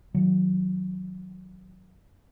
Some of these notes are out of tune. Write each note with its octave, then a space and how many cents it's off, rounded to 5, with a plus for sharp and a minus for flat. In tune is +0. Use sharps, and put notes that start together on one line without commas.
D#3 +35 F#3 +0